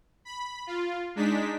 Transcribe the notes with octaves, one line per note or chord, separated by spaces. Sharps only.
B5
F4
G#3 D4 D#4 B6